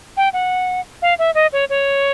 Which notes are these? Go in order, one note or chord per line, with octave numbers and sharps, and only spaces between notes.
G5
F#5
F5
E5
D#5
C#5
C#5